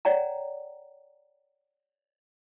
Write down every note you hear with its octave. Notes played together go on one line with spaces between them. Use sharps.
C#5 D5 F#5 G5 A#5